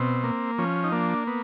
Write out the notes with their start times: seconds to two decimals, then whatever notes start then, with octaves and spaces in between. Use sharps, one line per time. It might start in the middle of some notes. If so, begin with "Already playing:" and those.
Already playing: B2 C4
0.24 A#3
0.58 F3 C#4
0.84 D#4
0.92 A#3 D4
1.27 B3